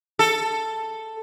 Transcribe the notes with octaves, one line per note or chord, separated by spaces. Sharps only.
A4